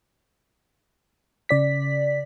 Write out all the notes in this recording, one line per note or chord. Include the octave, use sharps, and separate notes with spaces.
C#3 D5 B6